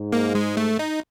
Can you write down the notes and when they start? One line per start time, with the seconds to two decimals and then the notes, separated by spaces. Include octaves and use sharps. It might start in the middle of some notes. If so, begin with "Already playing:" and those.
Already playing: G#2
0.12 A#3
0.35 G#3
0.57 A3
0.79 D#4